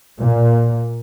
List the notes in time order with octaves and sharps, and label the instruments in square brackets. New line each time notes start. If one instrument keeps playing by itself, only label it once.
[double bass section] A#2